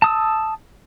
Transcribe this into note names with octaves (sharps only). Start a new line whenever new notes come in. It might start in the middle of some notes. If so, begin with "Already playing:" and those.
A5 D#6 E6